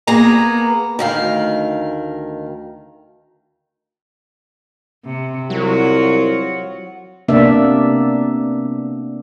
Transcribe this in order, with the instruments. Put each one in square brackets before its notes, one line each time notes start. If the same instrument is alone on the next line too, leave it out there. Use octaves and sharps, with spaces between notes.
[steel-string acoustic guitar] A#3 B3 G#4 A#5
D2 D#3 F5
[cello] C3
[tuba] C2 [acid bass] F#3 [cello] F4 F#4
[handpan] C3 A#3 B3 D4 D5 E5